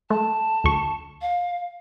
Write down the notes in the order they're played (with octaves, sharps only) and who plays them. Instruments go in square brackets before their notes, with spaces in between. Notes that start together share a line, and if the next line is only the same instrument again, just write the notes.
[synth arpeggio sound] A3 [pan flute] A5
[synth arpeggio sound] D2 C#6
[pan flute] F5